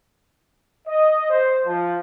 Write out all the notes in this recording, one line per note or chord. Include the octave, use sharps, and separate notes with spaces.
D#5
C5
F3